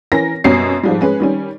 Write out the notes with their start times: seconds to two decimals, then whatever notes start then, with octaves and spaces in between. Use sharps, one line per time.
0.12 E3 C#4 A#4 A#6
0.44 F#2 B2 G3 C#5 C7
0.83 G#2 F3 G3
1.01 G#3 C#4 B4
1.20 D#3 G3 C#4